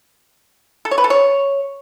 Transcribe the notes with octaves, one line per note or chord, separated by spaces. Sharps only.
A4
C#5
B4
A4
C#5